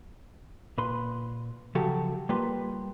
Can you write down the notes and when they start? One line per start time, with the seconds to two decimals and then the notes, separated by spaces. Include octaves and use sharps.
0.78 A#2 B4 C6
1.75 C#3 F3 F#3 F#4 G4 A4
2.29 G3 A#3 F4 G4 B4 C6